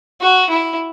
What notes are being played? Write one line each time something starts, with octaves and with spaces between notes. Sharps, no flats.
F#4
E4